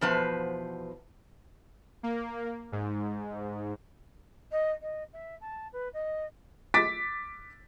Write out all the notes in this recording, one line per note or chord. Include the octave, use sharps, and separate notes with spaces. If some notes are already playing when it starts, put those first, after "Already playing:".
E2 B2 F3 B4 C5 A5
A#3
G#2
D#5
D#5
E5
A5
B4
D#5
D6 A6 B6 D7